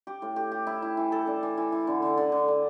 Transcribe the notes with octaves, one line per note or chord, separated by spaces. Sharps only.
G4
A2
G4
G4
E4
E4
E3
A4
D4
E3
E3
E3
D3
D3
D3
D3
D4